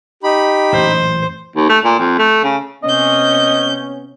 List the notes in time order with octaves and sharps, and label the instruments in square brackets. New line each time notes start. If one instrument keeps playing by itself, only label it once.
[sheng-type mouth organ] D#4 B5 [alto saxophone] G4
[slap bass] A1 F#2 A#2 [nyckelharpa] C5
[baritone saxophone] D#2
A3
A#2
F2
A3
C#3
[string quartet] C3 G6 [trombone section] B3 C#4 [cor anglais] D#5